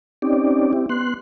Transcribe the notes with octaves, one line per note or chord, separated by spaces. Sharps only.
C4 C#4 D#4 G4 D5
C4 E4 G4
B3 C6 F#6